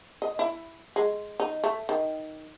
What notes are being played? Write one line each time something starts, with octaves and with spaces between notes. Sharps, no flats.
D#5
E4
G#3
D#4
A3
D#3